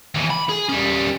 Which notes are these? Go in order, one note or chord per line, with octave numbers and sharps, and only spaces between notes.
D#2 E3
B5
G#4
G3 C#4